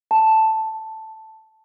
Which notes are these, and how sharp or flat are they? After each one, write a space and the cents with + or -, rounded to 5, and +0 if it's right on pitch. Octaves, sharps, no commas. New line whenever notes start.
A5 +0